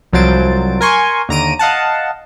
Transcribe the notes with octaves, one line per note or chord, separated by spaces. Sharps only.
C2 F3 F#3 C5 A6 D7
A#4 G#5 C6 C#6
D#2 D3 A#5 A#6 D7 D#7
D#5 F5 F#5 A5